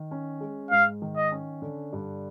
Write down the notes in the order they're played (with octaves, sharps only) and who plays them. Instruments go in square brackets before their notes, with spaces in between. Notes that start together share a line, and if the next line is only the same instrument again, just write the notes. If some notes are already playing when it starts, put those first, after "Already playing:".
Already playing: [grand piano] D#3
C#4
G#3
[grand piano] G#2 [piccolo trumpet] F5
[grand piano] D#3
[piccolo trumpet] D#5
[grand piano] C#4
D3
G2